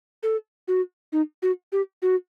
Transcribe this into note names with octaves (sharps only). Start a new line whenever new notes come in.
A4
F#4
D#4
F#4
G4
F#4